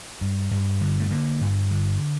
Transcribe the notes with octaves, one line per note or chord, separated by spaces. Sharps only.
G2
G2
D3
A3
D3 A#3
G2
D3